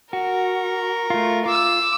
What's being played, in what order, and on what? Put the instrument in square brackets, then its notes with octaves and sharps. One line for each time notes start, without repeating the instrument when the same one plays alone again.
[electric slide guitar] F#4 [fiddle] A#4
[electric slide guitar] A3 F4
[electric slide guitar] F4 [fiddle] D6 E6